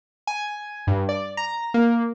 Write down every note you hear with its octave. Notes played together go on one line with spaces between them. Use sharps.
G#5
G2
D5
A#5
A#3